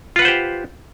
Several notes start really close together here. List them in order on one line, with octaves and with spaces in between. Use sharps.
F4 B4 F#5 C5 G4